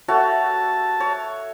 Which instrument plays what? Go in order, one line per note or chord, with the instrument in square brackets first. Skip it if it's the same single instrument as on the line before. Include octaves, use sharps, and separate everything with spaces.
[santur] A3 F#4 C#5 [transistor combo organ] A5
[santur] C#5